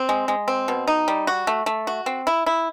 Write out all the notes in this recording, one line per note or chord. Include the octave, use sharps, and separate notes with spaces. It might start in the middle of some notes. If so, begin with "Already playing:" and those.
Already playing: C4
G#3
G#3
C4
B2
D#4
G3
F#4
A3
A3
F#4
C4
E4
E4